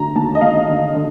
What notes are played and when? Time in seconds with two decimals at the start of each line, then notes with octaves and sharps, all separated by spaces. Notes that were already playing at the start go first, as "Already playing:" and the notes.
Already playing: D3 A3 A#5
0.16 D#2 A5
0.35 D#5
0.41 D#2 F5
0.68 D3
0.94 D3